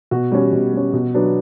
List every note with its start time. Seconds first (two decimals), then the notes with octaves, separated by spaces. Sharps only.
0.11 B2 F#4
0.32 G3 C#4
0.52 B2
0.73 G3 C#4
0.93 B2
1.14 F#3 B3 D4